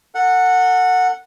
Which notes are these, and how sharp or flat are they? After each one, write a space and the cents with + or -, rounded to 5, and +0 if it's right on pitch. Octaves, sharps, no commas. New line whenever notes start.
A4 +40 F#5 -10